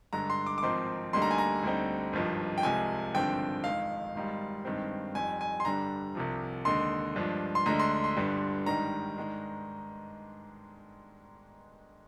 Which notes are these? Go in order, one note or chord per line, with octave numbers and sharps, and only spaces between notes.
G2 D3 G#3 A#5
C6
D6
D6
G#1 G#2 F3 C4 D#4 C6
D2 D3 G3 A#3 D#4 C6
A#5
G#5
A#5
D2 D3 G3 C4 D#4
G#1 G2 F3 G#3
G5
C2 C3 F3 G#3 G#5
G#1 G2 D3 F3 C4 G5
F2 D#3 G#3 F5
G#1 G#2 G3
G2 D#3 G#3 C4
F2 D#3 G3 G#5
G#5
C6
G2 D3 G3 D4 A#5
C2 C3 F3
D#2 D3 G#3 C6
G2 F3 G#3 D4
C6
D2 D3 G#3 D4 A#5
C6
C6
G1 G2 D3 G3
G#2 D#3 G3 D4 A#5
G#2 D#3 G#3 D4